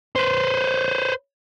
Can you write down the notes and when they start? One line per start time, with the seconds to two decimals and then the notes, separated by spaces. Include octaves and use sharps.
0.16 B4 C5